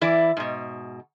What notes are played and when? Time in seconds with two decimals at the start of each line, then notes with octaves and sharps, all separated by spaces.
0.01 E3 E4 D5
0.37 G#2 B2